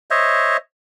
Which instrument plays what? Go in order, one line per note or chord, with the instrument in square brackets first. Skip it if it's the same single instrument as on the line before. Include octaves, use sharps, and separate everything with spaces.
[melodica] C5 C#5 D#5 E5